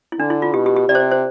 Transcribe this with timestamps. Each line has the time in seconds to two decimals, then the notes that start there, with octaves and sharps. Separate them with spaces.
0.12 E4
0.19 D3 D4
0.30 E4
0.42 F4
0.54 B2 G4
0.66 G4
0.76 G4
0.89 C3 D5
0.95 C5
1.00 D5
1.11 C5